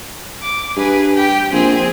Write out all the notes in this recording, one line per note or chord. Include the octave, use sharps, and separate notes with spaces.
D6
G2 G#4 B4
G4 G5
A#1 C4 G#4